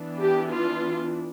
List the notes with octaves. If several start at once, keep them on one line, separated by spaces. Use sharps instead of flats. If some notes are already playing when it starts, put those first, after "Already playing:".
Already playing: E3 B3 D4
G4
F4